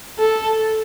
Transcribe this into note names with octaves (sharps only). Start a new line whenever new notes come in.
A4